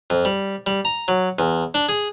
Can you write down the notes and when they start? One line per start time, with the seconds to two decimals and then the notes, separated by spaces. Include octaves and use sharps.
0.10 F2
0.25 G3
0.67 G3
0.85 A#5
1.08 F#3
1.39 E2
1.74 D4
1.89 G#4